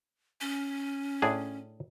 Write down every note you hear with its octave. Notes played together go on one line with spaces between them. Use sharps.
C#4
A2 D4 G#4